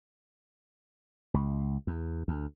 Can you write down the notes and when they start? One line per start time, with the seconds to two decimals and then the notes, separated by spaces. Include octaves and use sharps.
1.34 C#2
1.87 E2
2.28 D2